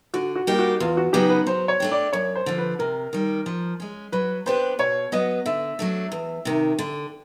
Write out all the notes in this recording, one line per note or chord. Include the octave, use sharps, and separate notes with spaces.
D3 F#4
F#4
G3 A#3 D#4 G4
F#4
E2 F4
F#4
C#3 F#3 B3 D#4 G4
B4
F#3 C5
C#5
A3 D4 G4
D5
F#2 C#5
C5
D3 F3
B4
C3 A#4
D#3 G3
F3
G#3 C#4
F#3 B4
B3 D4 G4 B4 C5
B2 C#5
F#3 B3 D#5
D3 E5
F#3 A3 D4
E2
C3 D#3
D3